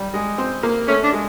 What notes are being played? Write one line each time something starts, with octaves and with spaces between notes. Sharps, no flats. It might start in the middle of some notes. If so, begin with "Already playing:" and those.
Already playing: G3
G#3
C4
A#3
A3 C#4
D4
G#3